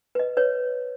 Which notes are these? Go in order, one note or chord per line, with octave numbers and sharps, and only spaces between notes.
B4 D#5
B4 C#5